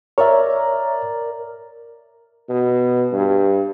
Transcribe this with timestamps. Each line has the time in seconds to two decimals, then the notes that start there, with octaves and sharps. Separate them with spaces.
0.18 A#4 C#5 D5 E5
2.50 B2
3.13 G2